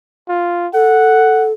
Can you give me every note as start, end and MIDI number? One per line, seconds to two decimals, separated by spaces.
0.28 0.68 65
0.74 1.53 69
0.74 1.48 78